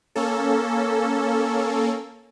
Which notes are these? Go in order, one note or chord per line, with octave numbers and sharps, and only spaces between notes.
A#3 C#4 A4